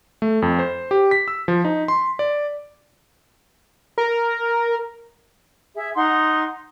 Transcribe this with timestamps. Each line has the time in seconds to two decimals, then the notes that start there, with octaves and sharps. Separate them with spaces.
0.22 A3
0.42 F2
0.59 C5
0.91 G4
1.11 B6
1.28 E6
1.48 F3
1.65 D#4
1.88 C6
2.19 D5
3.98 A#4
5.75 G#4 E5
5.95 D#4 F#5 C6